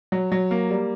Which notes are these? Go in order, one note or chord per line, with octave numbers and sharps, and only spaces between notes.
F#3
F#3
A#3
G3